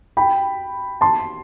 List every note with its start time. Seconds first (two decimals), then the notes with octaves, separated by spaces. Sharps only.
0.17 G5 B5
1.01 A5 C6